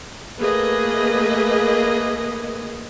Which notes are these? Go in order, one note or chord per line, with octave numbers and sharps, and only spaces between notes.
A3 A#3 G#4 B4 D#5